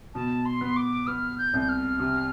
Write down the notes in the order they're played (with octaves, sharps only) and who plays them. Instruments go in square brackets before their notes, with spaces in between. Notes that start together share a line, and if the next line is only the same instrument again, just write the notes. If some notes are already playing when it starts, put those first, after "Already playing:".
[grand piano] B2 [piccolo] A5
[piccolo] C6
[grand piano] B3
[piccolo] D6
[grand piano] B3 [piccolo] F6
[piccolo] G6
[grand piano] C2
[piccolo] G6
F6
[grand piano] C3